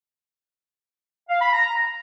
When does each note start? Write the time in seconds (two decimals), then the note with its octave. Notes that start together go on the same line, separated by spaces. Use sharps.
1.29 F5
1.41 B5
1.53 A#5